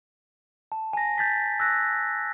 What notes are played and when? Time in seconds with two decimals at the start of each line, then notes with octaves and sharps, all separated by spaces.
0.72 A5
0.93 G#5 A#6
1.18 G6 A6 B6
1.60 E6 F#6 A#6